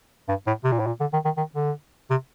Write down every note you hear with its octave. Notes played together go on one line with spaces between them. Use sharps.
G2
A2
C3
A#2
A2
A#2
D3
D#3
D#3
D#3
D3
C3